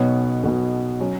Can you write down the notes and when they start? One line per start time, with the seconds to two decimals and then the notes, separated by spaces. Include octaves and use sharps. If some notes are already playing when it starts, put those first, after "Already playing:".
Already playing: B1 B2 B3 C#5
0.44 B1 B2 B3
1.00 F#3 C#4